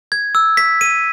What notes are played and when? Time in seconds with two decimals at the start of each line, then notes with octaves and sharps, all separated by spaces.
0.12 G#6
0.35 E6
0.57 B6
0.81 D#7